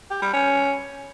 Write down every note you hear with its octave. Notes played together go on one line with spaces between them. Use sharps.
G4
G3
C#4